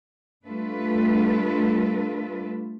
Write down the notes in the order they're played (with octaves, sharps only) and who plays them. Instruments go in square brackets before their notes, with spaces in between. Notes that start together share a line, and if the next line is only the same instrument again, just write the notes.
[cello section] G3 A3 D4 F4 A4 B4